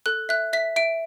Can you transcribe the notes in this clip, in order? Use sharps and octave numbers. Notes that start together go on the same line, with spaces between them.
A4 F#6
E5 F#6
E5 B6
E5 D7